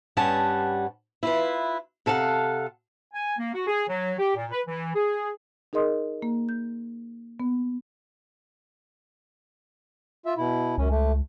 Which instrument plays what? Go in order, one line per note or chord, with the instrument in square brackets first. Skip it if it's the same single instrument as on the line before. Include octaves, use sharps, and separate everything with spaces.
[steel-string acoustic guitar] G2 G3 C#4 F#5 A5
E4 F4 B4
C3 A4 F5 F#5
[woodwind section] G#5
A#3
F#4
G#4
F#3
G4
A#2
B4
E3
G#4
[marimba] D#4 G#4 A#4 D#5 C6 D#6
A#3
G6
B3
[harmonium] F4 E5
B2 E4
[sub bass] C#2 [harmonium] F#2 C#4
[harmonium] A3